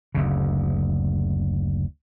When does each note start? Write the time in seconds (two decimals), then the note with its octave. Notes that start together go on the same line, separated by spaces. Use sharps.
0.15 F#1 D2 C#3